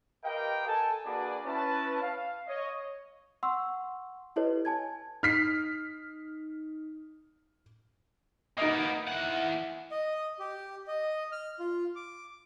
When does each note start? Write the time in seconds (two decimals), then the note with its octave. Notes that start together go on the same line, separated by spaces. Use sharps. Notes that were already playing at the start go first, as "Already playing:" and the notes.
0.24 G4 A#4 B4 D#5 F5 G5
0.67 A4 G#5 A5
1.05 A#3 D4 F#4 G#4 B4 D5
1.46 C#4 E4 B4 A5
2.03 F5
2.48 C#5 D#5
3.43 F#5 C6 C#6 E6
4.36 E4 G4 A4 B4 C#5 D#5
4.65 G#5 A5 G#6
5.23 D#4 F6 B6 C7
8.58 A#3 B3 D#4 D#5
9.07 E3 F#5
9.91 D#5
10.39 G4
10.88 D#5
11.32 F6
11.59 F4
11.96 D6